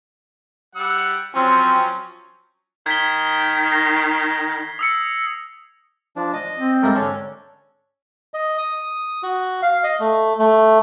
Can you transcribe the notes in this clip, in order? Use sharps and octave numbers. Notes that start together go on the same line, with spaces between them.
G3 F#5 E6
F3 F#3 C4 C#4
D#3 G#6 B6 G7
A#6 C7
D#6 E6 C#7
F3 D4
D#5 A5
C4
G#2 G3 A3 A#3 A4 A#4
D3 C#4 D4 A4 C#5
D#5
D#6
F#4
F5
D#5
A3
A3